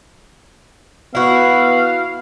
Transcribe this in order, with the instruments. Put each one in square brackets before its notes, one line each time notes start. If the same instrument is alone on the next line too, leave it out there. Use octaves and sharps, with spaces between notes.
[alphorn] B3 [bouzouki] E4 F#4 [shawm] F5